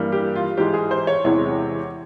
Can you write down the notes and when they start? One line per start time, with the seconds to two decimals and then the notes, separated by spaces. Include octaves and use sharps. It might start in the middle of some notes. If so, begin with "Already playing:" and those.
Already playing: G2 E3 G3 A#3
0.12 G4
0.36 F4
0.57 G#2 E3 G#3 G4
0.74 G#4
0.91 C5
1.07 C#5
1.24 E2 C3 E3 G#3 C#5